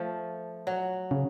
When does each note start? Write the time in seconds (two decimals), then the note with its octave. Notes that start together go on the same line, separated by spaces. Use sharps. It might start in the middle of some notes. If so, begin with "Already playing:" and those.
Already playing: F3 A3
0.67 F#3
1.11 C#3